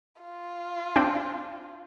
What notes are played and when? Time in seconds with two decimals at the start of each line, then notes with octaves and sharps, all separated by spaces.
0.21 F4
0.96 C4 D4 G5